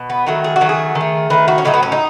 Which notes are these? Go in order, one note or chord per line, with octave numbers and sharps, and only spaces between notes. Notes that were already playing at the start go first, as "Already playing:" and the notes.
Already playing: B2
B3
D#3 F#3 A3
G#4
F#4
D#3 F#3 A3
G#4
D#3
A3
D#3 A3 B4
F#4
C#4
A2 F#3 A3 D#4
B3
C#4
D#4